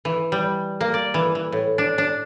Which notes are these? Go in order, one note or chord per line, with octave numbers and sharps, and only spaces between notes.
E3
G3
A#3
D5
E3
E3
A2
D4
D4